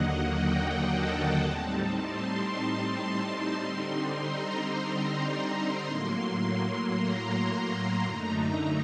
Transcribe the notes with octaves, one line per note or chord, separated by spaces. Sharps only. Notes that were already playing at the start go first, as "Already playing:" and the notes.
Already playing: D#2 D3 F#3 A#3 D#5 F#5
G5
A5
A2 G3 C4 D#4 A5
C6
C6
D3 G3 C4 D#4
A#5
A2 F#3 A#3 C6
A#5
F#2 D3 A3 D#4